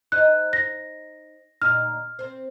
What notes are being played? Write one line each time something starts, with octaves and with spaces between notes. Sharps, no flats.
D#4 C5 D#5 F#6
A#6
D2 A#2 D#4 F6
C4 C5